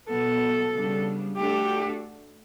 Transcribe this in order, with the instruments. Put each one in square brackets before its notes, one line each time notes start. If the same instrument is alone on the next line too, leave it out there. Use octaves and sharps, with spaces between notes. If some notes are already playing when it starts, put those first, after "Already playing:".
[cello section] B2 F#3 B3 [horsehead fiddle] A4
[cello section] C#3 G3 B3 D4
[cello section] A3 D4 F#4 A4 [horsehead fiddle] G4